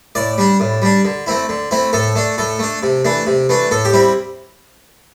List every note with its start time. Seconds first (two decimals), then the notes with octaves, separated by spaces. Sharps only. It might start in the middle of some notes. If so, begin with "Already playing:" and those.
0.15 A2 D5
0.38 G3 D4
0.60 A2
0.82 G3 D4
1.05 D3
1.26 A3 C4 E4
1.49 D3
1.71 A3 C4 E4
1.93 A2 A4
2.15 A3 D4
2.38 A2 A4
2.59 A3 D4
2.83 C3
3.05 E3 A3 D4
3.27 C3
3.49 E3 A3 D4
3.71 A2 A4
3.85 G4
3.93 G3 C4 E4